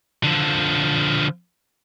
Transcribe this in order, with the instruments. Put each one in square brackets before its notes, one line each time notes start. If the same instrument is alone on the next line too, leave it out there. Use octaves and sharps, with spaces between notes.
[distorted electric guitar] D3 F3